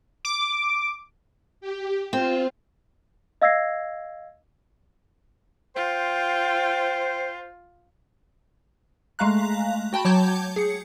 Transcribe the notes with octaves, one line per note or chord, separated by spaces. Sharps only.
D6
G4
C4 F4
D#5 F5 E6 G#6 A#6 C7
F4 C5 G5
G#3 A3 F5 A#5 F#6
F#4 G5 A5 B5
F#3 C#5 A5 D6 G6 G#6
G#4 C#7